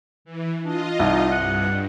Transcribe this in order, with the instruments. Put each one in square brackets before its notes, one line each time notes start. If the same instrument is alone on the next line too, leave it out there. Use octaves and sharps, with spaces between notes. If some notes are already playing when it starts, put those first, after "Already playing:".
[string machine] E3
[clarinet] D4 [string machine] F4 D#5
[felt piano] C2 [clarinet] D#4
[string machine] G2 [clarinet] F#5